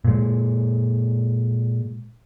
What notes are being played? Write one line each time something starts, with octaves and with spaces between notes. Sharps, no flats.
A#2 G#3